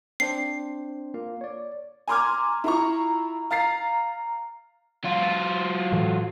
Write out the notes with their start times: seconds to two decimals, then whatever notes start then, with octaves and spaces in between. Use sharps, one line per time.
0.20 C4 D4 C5 C7
1.14 A#3 F4 F5
1.41 C#5 D5
2.08 G#5 A#5 C6 D6 F6 G#6
2.64 E4 F4 A#5 C#6
3.51 F5 A#5 A6 C7
5.04 F#3 F4
5.92 A2 E3